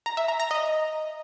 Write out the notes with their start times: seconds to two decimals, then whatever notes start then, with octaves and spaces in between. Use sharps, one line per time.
0.06 A#5
0.17 E5
0.28 A#5
0.40 A#5
0.51 D#5